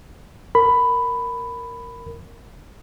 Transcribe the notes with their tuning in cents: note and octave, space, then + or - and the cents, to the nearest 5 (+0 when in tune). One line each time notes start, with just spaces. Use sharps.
A#4 -5 B5 +10